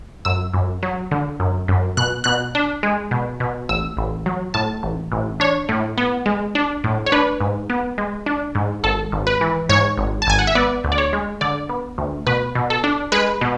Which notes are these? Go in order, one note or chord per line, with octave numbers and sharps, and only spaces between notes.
F#2 E6
F#2
F#3
D3
F#2
F#2
B2 F#6
B2 F#6
D4
G#3
B2
B2
A1 E6
A1
F#3
A2 A5
A1
A1
D4 C#5
A2
B3
G#3
D4
A2
C#5
D4 B4
G#2
B3
G#3
D4
G#2
G#1 A4
G#1
B4
E3
G#2 C#5
G#1
A5
G#1 G#5
F#5
E5
B3 D5
D2
D5
C#5
G#3
D3 D5
B3
D2
B2 B4
B2
A4
D4
G#3 B4
B2